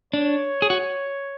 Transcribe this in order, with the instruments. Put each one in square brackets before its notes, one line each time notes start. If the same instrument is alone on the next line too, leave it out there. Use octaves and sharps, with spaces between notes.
[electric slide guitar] D4 [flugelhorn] C#5
[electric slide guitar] G#4
F#4